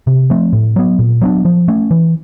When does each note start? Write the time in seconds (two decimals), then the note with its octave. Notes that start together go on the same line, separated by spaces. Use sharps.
0.07 C3
0.30 F3 A3 C4
0.53 A2
0.76 F#3 B3
0.99 A#2
1.21 F#3 B3 D4
1.45 F3
1.68 A3 C#4
1.91 E3